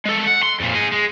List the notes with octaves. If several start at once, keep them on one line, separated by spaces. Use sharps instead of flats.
G#3 A4
F#5
C6
F2 A#2
D#4 G#4
G#3